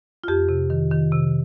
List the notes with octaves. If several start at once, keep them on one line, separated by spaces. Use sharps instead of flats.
F4
F2 G4
C3
D#3
D#3
C3